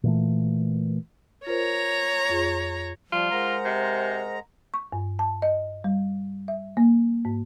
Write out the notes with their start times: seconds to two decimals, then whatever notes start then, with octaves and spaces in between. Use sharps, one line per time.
0.03 A#2 E3 A3
1.47 F4 A#4 C5 C#5 A#5
2.30 F2 F4 G#4
3.12 F3 G3 F4
3.31 G#3 A#4 C5 F#5 A#5
3.65 C3
4.74 C#6
4.92 G2
5.19 A5
5.42 D#5
5.84 G3
6.48 E5
6.77 A#3
7.25 G#2